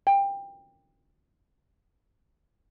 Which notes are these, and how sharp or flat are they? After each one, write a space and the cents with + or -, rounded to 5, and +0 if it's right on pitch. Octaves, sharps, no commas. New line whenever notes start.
G5 +20